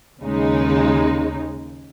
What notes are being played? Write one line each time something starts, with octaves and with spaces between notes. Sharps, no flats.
D#2 C#3 G#3 D#4